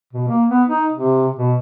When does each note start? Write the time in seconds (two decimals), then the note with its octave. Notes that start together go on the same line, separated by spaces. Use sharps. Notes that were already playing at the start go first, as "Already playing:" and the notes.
0.13 B2
0.28 A#3
0.49 B3
0.68 D#4
0.92 C3
1.37 B2